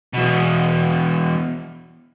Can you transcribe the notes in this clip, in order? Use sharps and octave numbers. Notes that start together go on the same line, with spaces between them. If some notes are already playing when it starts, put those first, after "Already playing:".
E2 B2